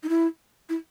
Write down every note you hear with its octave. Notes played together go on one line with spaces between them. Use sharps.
D#4
E4
E4